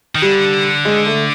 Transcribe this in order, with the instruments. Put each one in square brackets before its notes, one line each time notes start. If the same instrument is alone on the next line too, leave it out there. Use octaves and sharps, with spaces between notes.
[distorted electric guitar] D#3
[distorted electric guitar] D3 [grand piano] G3
[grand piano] G#3
A3